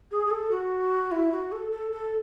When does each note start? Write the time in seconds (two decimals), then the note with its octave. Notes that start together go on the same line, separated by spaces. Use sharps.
0.11 G#4
0.26 G#4
0.31 A4
0.51 F#4
1.12 E4
1.32 F#4
1.52 A4
1.72 A4
1.92 A4